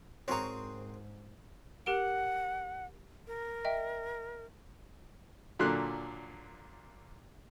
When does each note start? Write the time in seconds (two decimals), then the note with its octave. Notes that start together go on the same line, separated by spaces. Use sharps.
0.28 G#2 C4 F#4 G#4 A#4 C#5 A#5
1.86 G4 A#4 F#5 D7
3.27 A#4
3.65 D#5 E5 G5
5.59 A#2 D3 F#3 C6 F#6